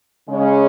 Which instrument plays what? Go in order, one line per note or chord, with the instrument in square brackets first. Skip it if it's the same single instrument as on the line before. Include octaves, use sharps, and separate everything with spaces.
[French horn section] C#3 G#3 C#4